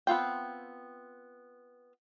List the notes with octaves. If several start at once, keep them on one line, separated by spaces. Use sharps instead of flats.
B3 C4 F4 G5